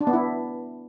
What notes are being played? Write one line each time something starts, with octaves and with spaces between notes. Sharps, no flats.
D4
B3
E4